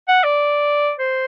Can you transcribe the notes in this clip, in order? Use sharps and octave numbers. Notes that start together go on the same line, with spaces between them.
F#5
D5
C5